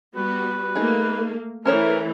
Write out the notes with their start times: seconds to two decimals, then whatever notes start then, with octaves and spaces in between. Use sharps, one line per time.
0.16 G3 B3 F#4 B4
0.75 A3 A#3 D#4 G#4
1.66 E3 A3 C#4 A#4 C5 C#5